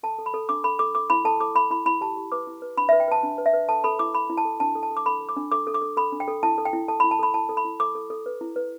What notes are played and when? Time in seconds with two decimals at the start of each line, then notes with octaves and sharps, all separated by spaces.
0.03 A4 A5
0.18 A4
0.26 B5
0.34 A4
0.49 D4 D6
0.64 A4 B5
0.79 A4 D6
0.95 A4 D6
1.10 E4 B5
1.25 A4 A5
1.40 A4 D6
1.55 A4 B5
1.71 E4 B5
1.86 E4 B5
2.01 G4 A5
2.16 G4
2.32 B4 D6
2.47 E4
2.62 B4
2.77 D4 B5
2.89 B4 E5
3.00 G5
3.08 B4 A5
3.23 D4
3.38 B4
3.46 E5
3.53 B4
3.69 A4 A5
3.84 A4 B5
3.99 E4 D6
4.14 A4 B5
4.30 E4
4.37 A5
4.45 A4
4.60 D4 A5
4.75 A4
4.83 A5
4.91 A4
4.97 D6
5.06 A4 B5
5.21 A4
5.29 D6
5.36 D4
5.52 A4 D6
5.67 A4
5.74 D6
5.82 A4
5.97 A4 B5
6.12 D4
6.20 G5
6.28 A4
6.43 E4 A5
6.58 A4
6.65 G5
6.73 E4
6.88 A4 A5
7.00 E4 B5
7.11 A5
7.19 A4 B5
7.34 E4 A5
7.49 A4
7.57 B5
7.65 E4
7.80 A4 D6
7.95 A4
8.10 A4
8.26 B4
8.41 E4
8.56 B4